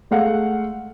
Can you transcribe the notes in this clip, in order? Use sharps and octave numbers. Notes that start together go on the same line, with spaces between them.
G#3 A3 F5 F#5